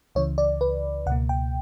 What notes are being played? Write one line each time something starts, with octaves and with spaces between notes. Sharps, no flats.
C#2 C#3 E3 C#5
D5
B4
C#2 B2 A#3 F#5
G5